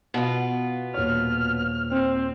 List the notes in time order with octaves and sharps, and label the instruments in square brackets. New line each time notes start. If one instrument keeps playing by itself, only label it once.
[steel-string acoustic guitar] B2 B3 F4
[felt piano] D#1 C#5 [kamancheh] F6
[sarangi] C4